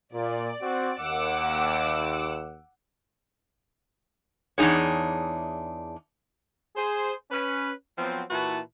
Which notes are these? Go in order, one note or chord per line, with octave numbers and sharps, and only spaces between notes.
A#2 D5
C4 F#4
D#2 F#5 D6 E6
E2 D4 D#4 G#4 C#5
G#4 C5
C#4 B4
F3 F#3 B3 C4
A#2 E3 E4 F#4 B4 A5